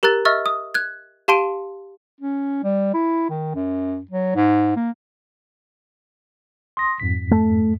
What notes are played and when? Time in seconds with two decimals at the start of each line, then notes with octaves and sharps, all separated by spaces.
0.03 G4 A#4 A#5 F#6 A6
0.25 D#5 E5 C#6 E6 F6 A6
0.46 D#6
0.74 F#6 G#6
1.28 G4 F5 A5 C6 D7 D#7
2.21 C#4
2.64 G3
2.94 E4
3.30 D#3
3.55 F#2
4.11 F#3
4.35 G#2
4.76 A#3
6.77 C6 D#6 A#6
7.00 F2 G#2 B6
7.31 A3